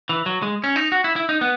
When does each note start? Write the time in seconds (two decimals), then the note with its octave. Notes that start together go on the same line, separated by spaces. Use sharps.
0.09 E3
0.26 F#3
0.42 G#3
0.64 C#4
0.76 D#4
0.92 F#4
1.04 E4
1.16 E4
1.29 D#4
1.41 B3